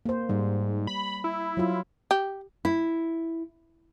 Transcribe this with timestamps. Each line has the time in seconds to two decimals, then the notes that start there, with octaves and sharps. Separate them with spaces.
0.06 A#3 C5
0.29 G#2 G3
0.87 B5
1.24 E4
1.57 F#3 F4
2.11 G4
2.65 E4